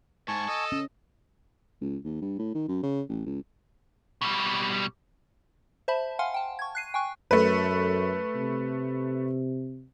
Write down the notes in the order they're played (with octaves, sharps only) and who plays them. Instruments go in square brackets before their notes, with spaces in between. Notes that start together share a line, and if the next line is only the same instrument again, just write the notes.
[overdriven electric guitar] G#2 [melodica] G#5 A5 C#6
[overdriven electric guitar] A4 [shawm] D#5
[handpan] C#4
[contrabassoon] C#2
D#2
G2
A2
D#3
F#2
C#3
A1
C#2
[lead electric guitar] B2 G3
[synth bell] C5 E5 A5 B5
F5 F#5 G#5 C6 F6
G5 A5
C#6 G#6
F#6 C7 D#7
G5 G#5 C#6 F#6
[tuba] F#2 [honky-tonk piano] A3 B4
[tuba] C3